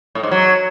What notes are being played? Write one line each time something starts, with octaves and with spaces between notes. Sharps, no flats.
A2
G#2
F#3